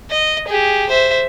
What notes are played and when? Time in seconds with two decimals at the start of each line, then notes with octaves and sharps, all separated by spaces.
0.10 D#5
0.47 G4 G#4
0.89 C5 E5